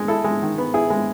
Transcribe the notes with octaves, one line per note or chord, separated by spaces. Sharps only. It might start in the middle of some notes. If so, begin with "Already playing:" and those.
Already playing: G#3
E4 A4
G#3
D#3
B3
E4 G#4
G#3